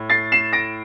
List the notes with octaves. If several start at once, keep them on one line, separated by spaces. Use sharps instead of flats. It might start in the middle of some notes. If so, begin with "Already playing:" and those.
Already playing: A2
A6 C7
C7 E7
A#6 D7